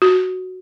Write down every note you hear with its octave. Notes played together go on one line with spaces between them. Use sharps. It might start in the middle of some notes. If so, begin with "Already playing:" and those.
F#4